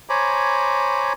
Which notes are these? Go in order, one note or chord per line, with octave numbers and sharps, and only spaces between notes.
C5 C#5 G#5 A#5 B5 D6